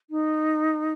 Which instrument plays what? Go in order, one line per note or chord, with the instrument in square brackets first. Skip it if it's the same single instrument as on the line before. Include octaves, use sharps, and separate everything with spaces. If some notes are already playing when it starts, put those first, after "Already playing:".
[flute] D#4